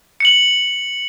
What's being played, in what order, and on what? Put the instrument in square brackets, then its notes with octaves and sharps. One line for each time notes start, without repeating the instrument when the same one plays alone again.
[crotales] C#7 F#7